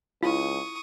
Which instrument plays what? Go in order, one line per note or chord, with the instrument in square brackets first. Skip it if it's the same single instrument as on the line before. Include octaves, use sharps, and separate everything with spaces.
[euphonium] C#2 [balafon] E4 [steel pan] F4 [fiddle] C#6 D#6